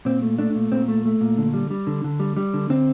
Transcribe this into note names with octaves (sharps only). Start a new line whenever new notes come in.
A#2 C4
A3
A3 D4
A#2
A#2 C4
A3
A3
A#2
D3
G3
G3
D3
D3
G3
G3
D3
D3 C4